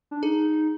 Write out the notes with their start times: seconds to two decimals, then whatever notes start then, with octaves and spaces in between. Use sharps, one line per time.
0.11 D4
0.22 D#4 G#4